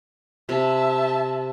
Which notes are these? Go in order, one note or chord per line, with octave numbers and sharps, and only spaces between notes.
C3 E5 A5